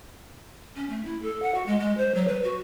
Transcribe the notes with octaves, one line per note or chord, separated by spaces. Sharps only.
C#4
A3
E4
A4
F#5
F#4
G#3
G#3
C5
F#3
B4
F#4